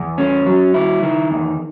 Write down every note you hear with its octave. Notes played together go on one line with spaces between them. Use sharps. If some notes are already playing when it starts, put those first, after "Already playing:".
Already playing: E2
C#4
F#3
E4
D#3
E2